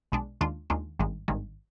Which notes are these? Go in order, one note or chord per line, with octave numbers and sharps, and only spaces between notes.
B1 B2 G#3 D4
D#2 D#3 G#3 D4 F4
D#2 D#3 G#3 D4 F4
G#1 G2 D#3 G#3
G#1 G2 D#3 G#3